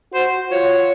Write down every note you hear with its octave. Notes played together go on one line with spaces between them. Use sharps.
F#4 C5
F4 C#5